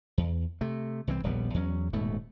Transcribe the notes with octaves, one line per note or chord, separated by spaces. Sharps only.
E2
C3 A3
C2 E3 G3 C4
D#1 A#1 G3 B3
E2 F#3 G3 C#4
D#1 G#2 B2 A3